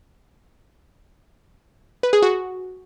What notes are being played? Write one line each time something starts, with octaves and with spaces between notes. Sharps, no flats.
B4
G#4
F#4